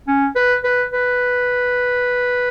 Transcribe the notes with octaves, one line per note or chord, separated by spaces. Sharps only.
C#4
B4
B4
B4